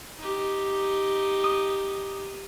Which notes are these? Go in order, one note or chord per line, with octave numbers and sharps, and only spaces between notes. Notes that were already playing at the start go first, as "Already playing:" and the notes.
D#4 G4
D#6